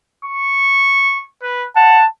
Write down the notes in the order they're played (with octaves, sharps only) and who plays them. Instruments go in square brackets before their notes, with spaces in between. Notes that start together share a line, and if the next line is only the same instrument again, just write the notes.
[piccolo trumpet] C#6
B4
[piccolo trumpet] F#5 [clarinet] A5